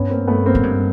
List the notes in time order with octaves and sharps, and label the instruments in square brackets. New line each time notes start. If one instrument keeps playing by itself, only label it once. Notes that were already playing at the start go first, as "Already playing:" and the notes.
Already playing: [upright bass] G2 [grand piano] B3 C#4
[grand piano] A#3 C4
A3 B3
A#3 C4
[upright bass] G#2
G2